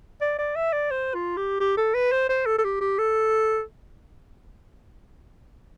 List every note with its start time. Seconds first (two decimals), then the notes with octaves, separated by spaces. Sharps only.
0.21 D5
0.39 D5
0.56 E5
0.73 D5
0.91 C5
1.14 F4
1.37 G4
1.60 G4
1.77 A4
1.94 B4
2.12 C5
2.29 C5
2.46 A4
2.58 A4
2.64 G4
2.81 G4
2.98 A4